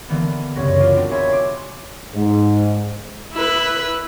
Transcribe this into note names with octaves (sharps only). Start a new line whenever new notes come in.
D3 E3 A#3 B3
C2 F#2 C#3 C#5 A#6
F4 B4 D5
C4 D4 F#4 A#4
C#5 D#5 E5 G#5 B5 C6
C6 D6
G#2
E4 B4